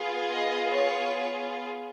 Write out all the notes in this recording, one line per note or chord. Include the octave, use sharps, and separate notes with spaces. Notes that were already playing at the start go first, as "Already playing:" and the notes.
Already playing: B3 F4 G#4
D#5
C#5